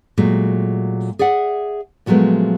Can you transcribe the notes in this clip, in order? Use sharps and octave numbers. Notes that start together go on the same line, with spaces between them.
A#2 F#3 G#3 A3
G#4 D5 E5 F#5
A#2 F3 F#3 G#3 A3 B3